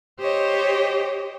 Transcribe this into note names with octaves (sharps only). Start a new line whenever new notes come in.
G4 C5 C#5 D#5